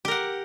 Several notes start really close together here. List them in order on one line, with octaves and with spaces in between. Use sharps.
G4 A#4 F#5